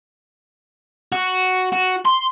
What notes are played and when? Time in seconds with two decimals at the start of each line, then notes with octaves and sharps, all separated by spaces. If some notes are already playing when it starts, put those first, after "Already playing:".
1.12 F#4
1.73 F#4
2.05 C6